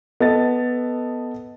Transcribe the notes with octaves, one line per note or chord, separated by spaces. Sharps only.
B3 A4 D#5 A6